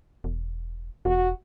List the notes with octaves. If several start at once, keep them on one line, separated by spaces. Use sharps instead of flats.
E1
E1 F#4